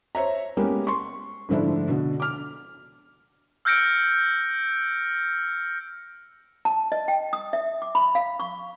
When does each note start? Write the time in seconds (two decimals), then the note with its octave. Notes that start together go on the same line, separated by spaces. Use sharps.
0.15 C5 C#5 E5 A#5
0.57 G#3 A#3 B3 C#4 G4
0.87 C6 C#6
1.49 G#2 D3 F3 A3 D4 E4
1.88 B2 D3
2.20 D6 F6
3.65 E6 F6 G6 A#6 C#7 D7
6.65 A5
6.92 D#5
7.08 G5
7.33 D#6
7.53 E5
7.82 D6
7.95 B5
8.15 F5
8.40 C#6